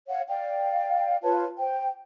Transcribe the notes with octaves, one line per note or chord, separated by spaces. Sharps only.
C#5 F5 F#5
D5 F5 G5
F4 B4 C#5 A5
C5 G5